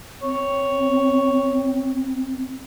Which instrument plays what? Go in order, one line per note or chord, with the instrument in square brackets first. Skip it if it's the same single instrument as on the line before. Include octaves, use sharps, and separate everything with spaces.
[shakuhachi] C4 [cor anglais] C#5